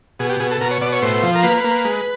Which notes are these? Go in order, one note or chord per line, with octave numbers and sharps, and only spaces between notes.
B2 G#4
G4
B2 G#4
A4
B2 A#4
C#5
B2 D5
C#5
A2 C5
F3
A#4
A#3 B4
B4
A#3
B4
G#3